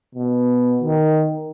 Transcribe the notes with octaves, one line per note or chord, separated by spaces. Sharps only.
B2
D#3